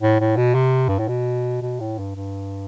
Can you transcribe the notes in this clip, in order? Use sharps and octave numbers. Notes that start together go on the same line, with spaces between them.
A2
A2
B2
C3
G2
A2
B2
B2
A2
G2
G2